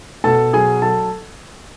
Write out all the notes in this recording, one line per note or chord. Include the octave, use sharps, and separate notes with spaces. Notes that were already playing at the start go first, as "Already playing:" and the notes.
B2 A4 A5
F#3 G#4 G#5
F#3 A4 A5